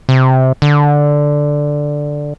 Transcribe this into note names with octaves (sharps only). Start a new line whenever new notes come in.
C3
D3